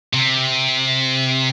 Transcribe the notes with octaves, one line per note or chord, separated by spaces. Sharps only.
C3